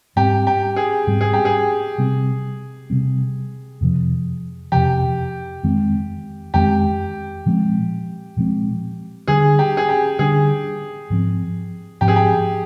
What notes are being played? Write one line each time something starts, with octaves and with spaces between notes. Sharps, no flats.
G#2 G3 C4 G4
G4
G#4
G#2 G3 C4
G#4
G4
G#4
C3 G3 C4
C3 G3 C4
F2 C3 F3
F2 C3 F3 G4
F2 D#3 G#3 C4
F2 D#3 G#3 C4 G4
A#2 F3 G#3 C4
A#2 F3 G#3 C4
D3 G3 D4 G#4
G4
G#4
G4
D3 G3 D4 G#4
G#2 F3 C4
G#2 F3 C4 G4
G#4
G4